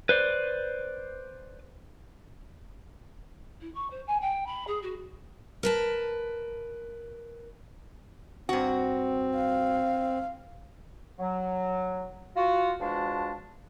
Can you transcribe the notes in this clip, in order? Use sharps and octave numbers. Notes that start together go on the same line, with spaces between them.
B4 C5 D5
E4
C#6
C5
G#5
G5
B5
G#4
F#4
A#4 B4 A5
G2 C4 F#4
F5
F#3
F4 F#4
E2 F3 G#3 D4 F#4 A5